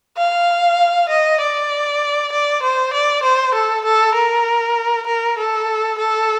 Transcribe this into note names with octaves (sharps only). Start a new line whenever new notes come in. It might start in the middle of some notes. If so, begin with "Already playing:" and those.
F5
D#5
D5
D5
C5
D5
C5
A4
A4
A#4
A#4
A4
A4